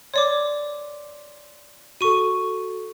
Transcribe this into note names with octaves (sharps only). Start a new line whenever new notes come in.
C#5 D5 C6 D6
F#4 A4 C#6 D#7